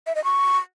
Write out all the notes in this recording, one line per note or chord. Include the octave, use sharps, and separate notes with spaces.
E5
D#5
C#6